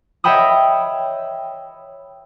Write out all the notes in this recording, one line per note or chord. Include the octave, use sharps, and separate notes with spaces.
C#5 D#5 E5 G5 B5 D#6